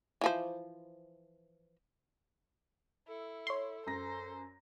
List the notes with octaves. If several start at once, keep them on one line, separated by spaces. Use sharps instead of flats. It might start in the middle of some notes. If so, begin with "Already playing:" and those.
E3 F3 C5
E4 A4
C#5 C6
F#2 C5 A#6